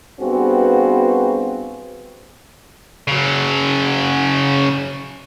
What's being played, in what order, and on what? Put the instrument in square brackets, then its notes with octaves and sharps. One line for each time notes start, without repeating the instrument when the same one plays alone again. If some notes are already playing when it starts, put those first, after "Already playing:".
[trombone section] G2 B3 C4 F#4 G#4
[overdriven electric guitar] C#3 F#3